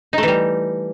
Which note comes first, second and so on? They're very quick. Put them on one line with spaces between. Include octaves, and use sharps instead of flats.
D#4 A3 E3 G3